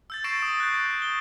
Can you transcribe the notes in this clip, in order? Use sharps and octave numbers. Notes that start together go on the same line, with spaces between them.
E6 G6 A6
C#6 A6 A#6 C7 D7 E7
D#6
F#6 G6
G6 C7
G7